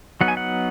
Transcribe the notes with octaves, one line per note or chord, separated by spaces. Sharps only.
F#3 B3 D#4 F#5
G#5
F#5